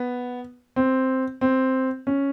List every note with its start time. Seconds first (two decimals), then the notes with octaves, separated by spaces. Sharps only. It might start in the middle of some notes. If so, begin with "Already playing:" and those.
Already playing: B3
0.76 C4
1.41 C4
2.07 C#4